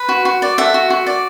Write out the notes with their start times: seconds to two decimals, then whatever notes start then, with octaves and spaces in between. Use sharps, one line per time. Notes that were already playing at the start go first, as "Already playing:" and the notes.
Already playing: B4
0.09 F#4
0.25 F#4
0.42 D5
0.58 A4 E5 F#5
0.74 F#4
0.90 F#4
1.06 D5